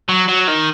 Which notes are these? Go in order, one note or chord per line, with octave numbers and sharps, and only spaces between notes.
F#3
F#3
D#3